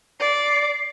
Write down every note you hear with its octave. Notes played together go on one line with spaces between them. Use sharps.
D5 C7